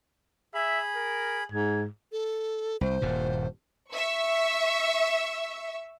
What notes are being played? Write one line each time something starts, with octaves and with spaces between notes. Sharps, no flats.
G#4 E5 B5
A#4
G#2 G#6
A4
C2 C5
D#1 G2 A#2
E5 C#6 E6